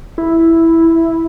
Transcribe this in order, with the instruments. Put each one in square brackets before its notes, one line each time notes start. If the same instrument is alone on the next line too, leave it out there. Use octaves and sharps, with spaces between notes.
[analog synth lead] E4